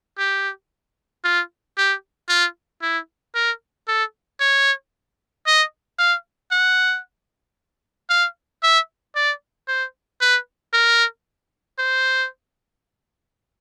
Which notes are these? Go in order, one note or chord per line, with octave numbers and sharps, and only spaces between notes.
G4
F4
G4
F4
E4
A#4
A4
C#5
D#5
F5
F#5
F5
E5
D5
C5
B4
A#4
C5